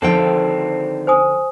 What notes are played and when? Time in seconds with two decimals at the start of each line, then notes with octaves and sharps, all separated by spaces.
0.02 D3 D#3 F3 C4 A4 G5
1.07 C5 G#5 D#6